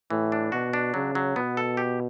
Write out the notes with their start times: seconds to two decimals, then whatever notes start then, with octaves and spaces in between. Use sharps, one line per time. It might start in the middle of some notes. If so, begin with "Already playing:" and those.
0.10 A2 E3
0.32 D4
0.52 B2 F#4
0.73 D4
0.94 C#3 F#3
1.15 F#3
1.36 B2 B3
1.57 A4
1.77 G4